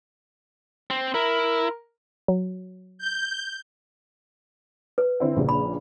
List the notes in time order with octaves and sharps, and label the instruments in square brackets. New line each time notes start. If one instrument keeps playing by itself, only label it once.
[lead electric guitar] C4
[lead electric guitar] E4 [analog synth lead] A#4
[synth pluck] F#3
[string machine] G6
[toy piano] B4
[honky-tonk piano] D3 C4 E4
A#1 A#2 C#3
[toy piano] B5